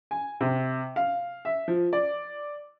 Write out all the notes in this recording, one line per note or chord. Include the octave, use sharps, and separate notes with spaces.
G#5
C3
F5
E5
F3
D5